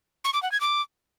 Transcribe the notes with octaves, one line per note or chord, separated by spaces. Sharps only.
C#6
D6
F#5
G#6
D6